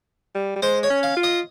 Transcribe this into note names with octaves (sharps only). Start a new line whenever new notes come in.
G3
G3
G#3 C5
C#5
C#4
F5
F4
D#5